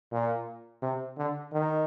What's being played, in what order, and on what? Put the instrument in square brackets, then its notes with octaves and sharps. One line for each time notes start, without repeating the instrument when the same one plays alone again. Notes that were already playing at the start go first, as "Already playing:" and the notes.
[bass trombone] A#2
C3
D3
D#3